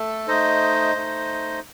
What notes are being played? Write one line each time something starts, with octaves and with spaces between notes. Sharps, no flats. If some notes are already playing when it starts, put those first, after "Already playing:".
Already playing: A3 A4
A3 D#4 C5 D#5
A3 D#4